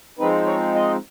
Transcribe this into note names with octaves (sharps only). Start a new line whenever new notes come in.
F3 G#3 C4 D#4 B4
C#5
D#5